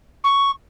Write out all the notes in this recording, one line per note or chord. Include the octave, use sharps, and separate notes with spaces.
C#6